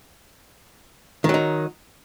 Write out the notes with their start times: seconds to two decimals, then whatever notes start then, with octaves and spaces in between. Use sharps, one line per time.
1.24 D#3
1.29 F#3
1.34 D#4